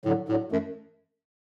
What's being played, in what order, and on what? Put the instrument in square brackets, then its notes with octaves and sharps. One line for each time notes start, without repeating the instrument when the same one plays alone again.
[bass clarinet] A2 [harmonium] D3 F#3
[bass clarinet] A2 [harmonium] D3 F#3
[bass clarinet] F#2 [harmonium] E3 A3